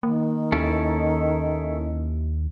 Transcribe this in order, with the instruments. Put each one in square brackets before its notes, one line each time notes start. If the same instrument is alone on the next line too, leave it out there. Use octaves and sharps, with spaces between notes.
[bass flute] D#3 [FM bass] A#3
[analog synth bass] D#2 [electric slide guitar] C#4 E4 A4